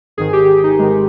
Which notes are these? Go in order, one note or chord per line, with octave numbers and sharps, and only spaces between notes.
G#1 G#2 D#3 G#4
G4
D#4
G#1 G#2 D#3 G#3